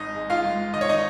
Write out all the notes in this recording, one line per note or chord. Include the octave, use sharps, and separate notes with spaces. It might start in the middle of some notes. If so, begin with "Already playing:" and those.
Already playing: G#1 D#4 D#5
G#3
F4 F5
G#2
D#3 D#5
C#5
D#4 D#5